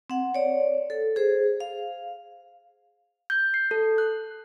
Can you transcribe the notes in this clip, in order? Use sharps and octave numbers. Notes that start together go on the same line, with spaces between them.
C4 F#5
C#5 D5
A4
G#4 C5
F5
G6
C7
A4
F#6